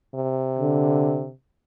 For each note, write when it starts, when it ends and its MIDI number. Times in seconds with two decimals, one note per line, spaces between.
0.15 1.32 48
0.59 1.27 50